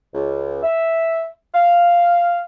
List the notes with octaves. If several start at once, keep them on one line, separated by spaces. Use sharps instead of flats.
C#2
E5
F5